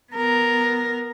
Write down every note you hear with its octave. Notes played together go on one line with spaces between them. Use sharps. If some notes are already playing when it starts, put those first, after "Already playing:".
B3 A#4